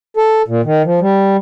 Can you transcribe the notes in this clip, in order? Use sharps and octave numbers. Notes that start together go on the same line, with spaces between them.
A4
A#2
D#3
F3
G3